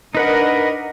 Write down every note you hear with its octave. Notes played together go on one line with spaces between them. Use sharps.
D4 D#4 A#4 B4 D#5 F#5